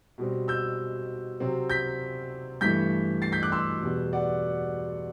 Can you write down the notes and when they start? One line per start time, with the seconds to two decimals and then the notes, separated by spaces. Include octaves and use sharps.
0.18 B2 G3 C4
0.48 E6 G6
1.40 C3 F#3 C4
1.70 G6 B6
2.61 G2 E3 A3 G6 B6
3.22 A6 C7
3.32 G6 B6
3.43 D6 F#6
3.52 C6 E6
3.82 E2 B2 G3 B3
4.13 D5 F#5